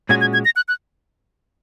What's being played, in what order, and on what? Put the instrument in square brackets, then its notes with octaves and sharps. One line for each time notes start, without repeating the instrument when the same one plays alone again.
[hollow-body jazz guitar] A#2 G#3 C#4 F#4 [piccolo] G#6
[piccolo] G#6
G#6
A#6
F#6
F#6